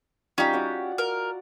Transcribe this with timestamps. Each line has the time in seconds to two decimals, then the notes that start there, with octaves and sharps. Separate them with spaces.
0.38 G3 C#4 D#4 F4 G4
0.53 F#4 D5 F#5
0.98 A#4